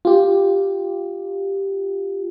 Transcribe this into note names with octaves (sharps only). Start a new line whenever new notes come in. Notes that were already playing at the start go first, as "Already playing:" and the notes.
F4 G4